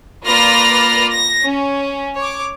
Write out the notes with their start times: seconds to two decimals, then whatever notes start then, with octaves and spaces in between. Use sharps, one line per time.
0.25 A#3 F4 B4 D5 F6 A#6
1.11 A#6
1.43 C#4
2.17 C#5 D6